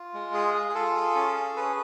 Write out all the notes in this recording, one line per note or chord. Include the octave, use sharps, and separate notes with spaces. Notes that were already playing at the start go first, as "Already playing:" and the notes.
Already playing: F4
G#3
G#4
G#4
G#4
F4 A4
G#4
C#4
G#4
C#4 B4